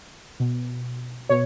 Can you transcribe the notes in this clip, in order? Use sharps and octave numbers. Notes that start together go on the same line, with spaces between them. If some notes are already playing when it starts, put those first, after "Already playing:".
B2
B2 C#5